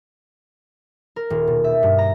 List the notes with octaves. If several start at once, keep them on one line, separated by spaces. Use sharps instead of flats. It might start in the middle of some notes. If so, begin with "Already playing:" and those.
A#4
D#1
B2
E5
G2
A#5